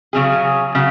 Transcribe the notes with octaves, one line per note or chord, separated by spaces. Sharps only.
C#3 F#3 C#4 G#4
C#3 F#3